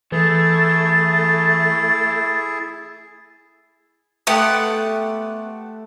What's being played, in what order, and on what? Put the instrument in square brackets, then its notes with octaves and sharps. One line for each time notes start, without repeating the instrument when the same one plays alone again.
[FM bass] E3 [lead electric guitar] A3 [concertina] E4 G#4 [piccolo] A6
[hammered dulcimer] A3 C6 [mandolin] B3 G4 F#5